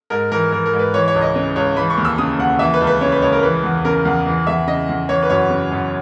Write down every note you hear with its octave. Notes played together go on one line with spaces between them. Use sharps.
G#2 A#4
E3 A#4
E3 A#4
A#4
G#2
B4
E3 C#5
C#5
C#2
D#5
C#3 D#5
C#2 C#5
E3 B5
C#6
D#2
E6
C#3 D#6
D#2 F#5
E3 E5
B4
C#2
B4
C#3 C#5
B4
C#2 C#5
A#4
E3 B4
E2
C#3 A#4
E2
E3
E2 E5
C#3 D#5
E2
E3 C#5
B4
F#2 C#5
C#3
F#2